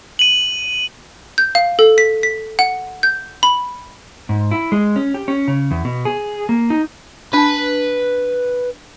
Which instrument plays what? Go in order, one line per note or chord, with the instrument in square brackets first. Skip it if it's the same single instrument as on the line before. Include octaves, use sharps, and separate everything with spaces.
[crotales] D#7 F#7
[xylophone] G6
F5
A4
B6
B6
F#5
G6
B5
[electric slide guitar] G#2
E4
G#3
C#4
G4
C#4
C#3
E2
B2
G#4
A#3
D#4
[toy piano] D4 A5 [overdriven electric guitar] B4 B5